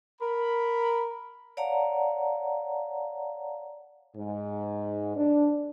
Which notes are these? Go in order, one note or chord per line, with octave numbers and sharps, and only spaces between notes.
A#4 B5
C#5 D5 F5 F#5 A5 A#5
G#2
D4